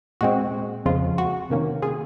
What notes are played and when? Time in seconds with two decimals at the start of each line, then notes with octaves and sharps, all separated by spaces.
0.21 A#2 G#3 C4 F#4
0.86 F2 C#3 F3 G#3 F4
1.18 F#4
1.50 C3 D#3 A#3 C#4
1.82 F4 G#4